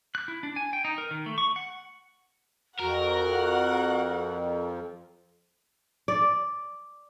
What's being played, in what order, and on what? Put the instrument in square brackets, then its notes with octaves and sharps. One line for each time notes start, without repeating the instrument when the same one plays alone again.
[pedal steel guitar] F#6
E4
D4
G#5
G5
D#4
A#4
D#3
A3
C#6
F#5
[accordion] F2 [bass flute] F#4 [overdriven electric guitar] A#4 [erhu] F#5
[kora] D5